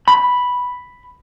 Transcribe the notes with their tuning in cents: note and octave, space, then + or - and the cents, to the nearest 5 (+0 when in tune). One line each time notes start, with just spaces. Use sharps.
B5 +0